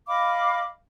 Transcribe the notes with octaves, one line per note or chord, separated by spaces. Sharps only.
D#5 F5 B5 D6